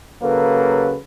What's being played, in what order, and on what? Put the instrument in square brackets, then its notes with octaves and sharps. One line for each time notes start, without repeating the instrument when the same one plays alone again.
[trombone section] C#3 F#3 A#3 A4 B4